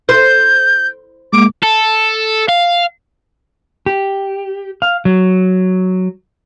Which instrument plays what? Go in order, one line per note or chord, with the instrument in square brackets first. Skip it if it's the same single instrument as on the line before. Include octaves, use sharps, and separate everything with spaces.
[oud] C5 [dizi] G6
[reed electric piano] G#3 A#3 [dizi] D6
[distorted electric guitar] A4
F5
[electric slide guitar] G4
F5
F#3